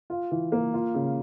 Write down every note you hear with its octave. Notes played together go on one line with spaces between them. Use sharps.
F4
E3
A#3
F4
C#3